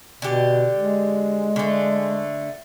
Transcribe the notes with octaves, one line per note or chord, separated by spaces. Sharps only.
B2 D3 G4
G#3
D3 A3